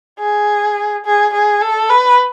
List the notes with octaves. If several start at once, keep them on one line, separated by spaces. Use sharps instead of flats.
G#4
G#4
G#4
A4
B4